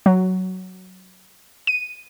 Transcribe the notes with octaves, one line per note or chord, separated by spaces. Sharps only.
F#3
D#7